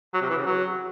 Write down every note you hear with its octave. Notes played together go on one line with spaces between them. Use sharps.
F#3
C3
E3
C#3
F#3